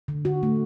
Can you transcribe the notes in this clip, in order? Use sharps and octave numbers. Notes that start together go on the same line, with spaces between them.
D3
D3 F#4
A3